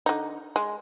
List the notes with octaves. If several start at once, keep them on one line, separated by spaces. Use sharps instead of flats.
D3 D#4
G#3